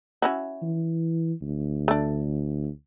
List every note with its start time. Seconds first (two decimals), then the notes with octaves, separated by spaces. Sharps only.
0.22 C#4 E4 F#4
0.62 E3
1.42 D2
1.88 A3 D4